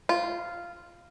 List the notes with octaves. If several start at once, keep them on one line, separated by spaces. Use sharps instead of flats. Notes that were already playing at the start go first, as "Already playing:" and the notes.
F4